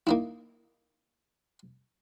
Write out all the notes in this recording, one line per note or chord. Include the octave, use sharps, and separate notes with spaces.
A#3 D#4 E4